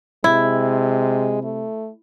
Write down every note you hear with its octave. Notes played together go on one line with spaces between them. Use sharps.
C3 G#3 E4
A3